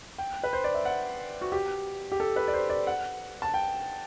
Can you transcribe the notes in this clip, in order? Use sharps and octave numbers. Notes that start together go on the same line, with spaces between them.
G5
B4
C5
D5
E5
F#5
F#4
G4
G4
A4
B4
D5
C5
D5
F#5
A5
G5